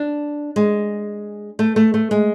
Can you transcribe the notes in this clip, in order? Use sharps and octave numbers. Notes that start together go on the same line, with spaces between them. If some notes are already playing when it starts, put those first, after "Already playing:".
Already playing: D4
G#3
A3
A3
A3
G#3